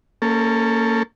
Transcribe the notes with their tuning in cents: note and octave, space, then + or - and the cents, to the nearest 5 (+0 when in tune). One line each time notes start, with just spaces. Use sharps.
A#3 -25 C#4 +0 A4 +0